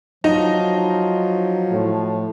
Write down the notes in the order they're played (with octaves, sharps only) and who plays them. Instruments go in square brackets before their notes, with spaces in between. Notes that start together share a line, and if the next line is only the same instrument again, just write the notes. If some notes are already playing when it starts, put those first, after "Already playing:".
[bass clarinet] F3 [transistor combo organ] F#3 F4 [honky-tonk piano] D#4
[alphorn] A2